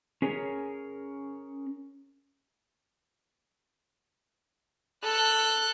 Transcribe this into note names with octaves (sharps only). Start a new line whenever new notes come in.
C#4 G#4 A#4 C#5
A4 F#6